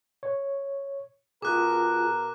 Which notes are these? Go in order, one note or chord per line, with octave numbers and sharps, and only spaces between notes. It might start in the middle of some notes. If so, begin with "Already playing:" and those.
C#5
B2 F4 G#4 A#4 D6 F#6